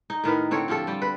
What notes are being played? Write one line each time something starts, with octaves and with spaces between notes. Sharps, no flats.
D#4
A2 D#3 A#4 B4
D3 C4 A4 C#5
F3 F4 G4 A4
G3 G4
B4